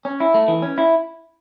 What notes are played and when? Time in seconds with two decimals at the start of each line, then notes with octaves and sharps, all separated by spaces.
0.05 C#4
0.20 E4
0.34 A3
0.48 E3
0.62 C#4
0.78 E4